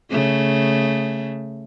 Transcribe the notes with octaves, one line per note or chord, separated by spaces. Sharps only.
C#3 A3